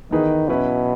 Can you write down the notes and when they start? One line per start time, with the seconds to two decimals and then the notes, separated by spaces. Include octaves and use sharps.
0.11 D#3 E3 B3 D#4 G#4 B4
0.48 B2 F#3 C#4 E4 B4